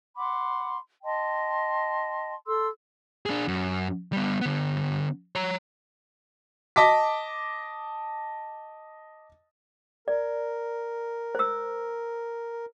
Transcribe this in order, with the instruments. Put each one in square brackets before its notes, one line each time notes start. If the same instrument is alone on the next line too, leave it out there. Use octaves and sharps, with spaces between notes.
[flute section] F#5 B5 C6 D6
D#5 G5 A5 C6
A4 C6 E6
[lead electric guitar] D4 G#4
F#2
G3 B3
D3 B3
C#5 A#5
[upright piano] D#5 A5 D6 B6
[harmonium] A#4 [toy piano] D5
[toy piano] C5 E6